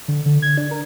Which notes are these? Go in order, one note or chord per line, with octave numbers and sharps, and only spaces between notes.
D3
D3
G#6
D4
A#4